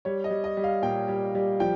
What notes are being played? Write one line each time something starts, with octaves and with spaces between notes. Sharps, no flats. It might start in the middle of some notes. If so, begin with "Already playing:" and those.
G3 C#5
D#5
G3
D#5
G3
F5
A#2 G5
G3
G3
F3 G5